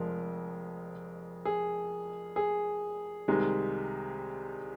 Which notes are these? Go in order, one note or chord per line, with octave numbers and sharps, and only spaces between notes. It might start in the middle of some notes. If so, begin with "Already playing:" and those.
Already playing: F1 F2 F3 G#3 A#4
G#4
G#4
C2 C3 D#3 G#3